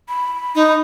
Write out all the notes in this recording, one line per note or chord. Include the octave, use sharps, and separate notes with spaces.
B5
D#4